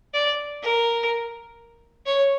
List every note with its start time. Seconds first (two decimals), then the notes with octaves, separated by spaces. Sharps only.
0.14 D5
0.63 A#4
2.06 C#5